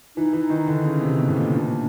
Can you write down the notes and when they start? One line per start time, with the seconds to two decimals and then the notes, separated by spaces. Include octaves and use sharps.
0.16 E3 D#4
0.33 E3
0.50 D#3
0.67 D3
0.85 C#3
1.02 C3
1.18 B2
1.28 A2
1.36 A#2
1.53 A#2 D4